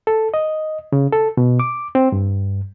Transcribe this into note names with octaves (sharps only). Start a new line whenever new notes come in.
A4
D#5
C#3
A4
B2
D6
C4
G2